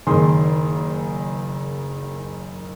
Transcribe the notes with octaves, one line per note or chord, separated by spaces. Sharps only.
F#1 D#3 G#4 C6